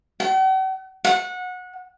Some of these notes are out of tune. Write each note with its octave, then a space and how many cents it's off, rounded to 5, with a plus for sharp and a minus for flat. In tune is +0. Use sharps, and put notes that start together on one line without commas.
F#5 +45
F#5 -25